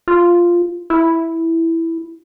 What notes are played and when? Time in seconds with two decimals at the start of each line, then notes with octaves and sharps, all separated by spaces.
0.08 F4
0.90 E4